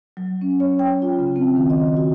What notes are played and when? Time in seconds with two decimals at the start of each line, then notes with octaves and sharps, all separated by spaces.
0.17 F#3
0.42 C#4
0.60 C#5
0.79 G5
1.02 F4
1.19 C#3
1.36 C4
1.56 D#3
1.70 D#5
1.97 F#4